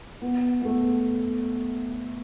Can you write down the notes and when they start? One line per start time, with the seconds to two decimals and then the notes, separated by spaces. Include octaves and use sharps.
0.22 B3
0.62 B3
0.65 A3